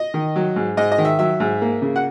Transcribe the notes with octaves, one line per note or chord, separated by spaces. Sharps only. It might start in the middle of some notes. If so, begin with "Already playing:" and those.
Already playing: D#5
D#3
F#3
G#2
G#2 D#5
D#5
D#3
E5
F#3 E5
G#2
A#3
C#3
F#5